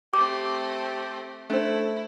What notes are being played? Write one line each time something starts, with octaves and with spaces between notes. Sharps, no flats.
A3 C4 G4 D6
A3 D4 E4 C5